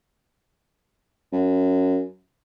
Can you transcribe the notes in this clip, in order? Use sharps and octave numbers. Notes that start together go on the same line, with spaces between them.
F#2